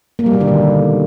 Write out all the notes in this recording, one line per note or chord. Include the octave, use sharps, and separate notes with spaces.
A#3
G3
B2
D3
D#3